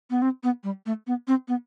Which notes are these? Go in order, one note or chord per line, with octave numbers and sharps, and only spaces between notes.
B3
C4
B3
G3
A3
B3
C4
B3